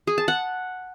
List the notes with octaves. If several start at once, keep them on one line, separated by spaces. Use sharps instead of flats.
G#4
A5
F#5